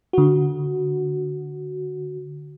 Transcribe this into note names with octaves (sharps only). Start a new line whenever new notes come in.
D3 F#4